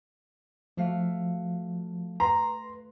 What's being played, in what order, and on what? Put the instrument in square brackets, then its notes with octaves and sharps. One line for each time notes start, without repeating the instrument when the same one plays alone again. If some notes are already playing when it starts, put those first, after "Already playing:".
[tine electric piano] F3 [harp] A3 F#4 F5
[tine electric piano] B4 C6 [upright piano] A#5